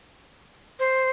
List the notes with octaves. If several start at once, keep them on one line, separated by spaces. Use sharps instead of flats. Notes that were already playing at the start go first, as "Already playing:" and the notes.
C5